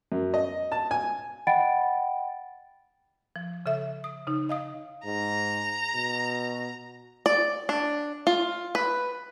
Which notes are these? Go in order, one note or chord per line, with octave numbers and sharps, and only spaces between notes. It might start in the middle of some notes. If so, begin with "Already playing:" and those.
F#2
D#5
A5
G#5
D#5 F#5 G5 B5 A6 D7
F3
C#3 A4 E5
D#6
C#3 D#4
D#5 F5 D#6
G#2 A#5
B2
D5
D4
F4
B4